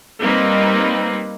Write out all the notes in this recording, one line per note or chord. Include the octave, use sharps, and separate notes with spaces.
G3 A#3 C4 D#4 B4